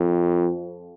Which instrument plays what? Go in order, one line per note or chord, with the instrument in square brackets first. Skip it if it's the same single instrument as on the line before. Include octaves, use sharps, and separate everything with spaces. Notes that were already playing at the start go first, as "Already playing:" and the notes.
Already playing: [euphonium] F2